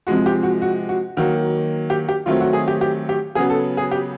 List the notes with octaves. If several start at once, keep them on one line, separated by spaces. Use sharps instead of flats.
C3 F3 G#3 F#4
G4
F#4
F#4
F#4
D#3 F#3 A#3 F#4
G4
G4
D#3 F#3 A3 C4 F4
F#4
G#4
G4
G4
G4
C#3 F#3 B3 G#4
A4
G#4
G4